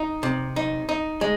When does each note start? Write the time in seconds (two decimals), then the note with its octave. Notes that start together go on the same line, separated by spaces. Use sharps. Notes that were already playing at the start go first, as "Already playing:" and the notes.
Already playing: D#4
0.23 C3
0.56 D#4
0.89 D#4
1.21 G#3